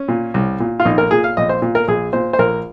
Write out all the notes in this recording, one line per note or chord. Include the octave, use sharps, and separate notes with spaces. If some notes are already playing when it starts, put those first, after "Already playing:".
Already playing: C#4
A#2
C2
A#2
F4
A#1 D#4
A#4
A#2 G#4
F5
A#1 D#5
C5
A#2
A#4
A#1 G#4
A#2 C5
C5
A#1 A#4